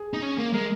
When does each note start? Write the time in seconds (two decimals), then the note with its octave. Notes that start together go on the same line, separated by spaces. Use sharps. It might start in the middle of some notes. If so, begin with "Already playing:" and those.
Already playing: G#4
0.13 D#4
0.22 C#4
0.38 A#3
0.53 G#3 A#4